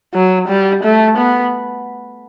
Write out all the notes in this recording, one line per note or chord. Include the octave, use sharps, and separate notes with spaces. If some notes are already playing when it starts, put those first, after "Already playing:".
F#3
G3
A3
B3